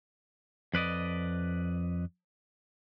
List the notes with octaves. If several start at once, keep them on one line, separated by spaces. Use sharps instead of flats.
F2 B4 D5 D#5